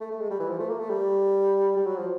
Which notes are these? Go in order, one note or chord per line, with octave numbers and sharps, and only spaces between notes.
A3
A3
G#3
G3
E3
F3
A3
A#3
A3
G3
G3
F#3
F3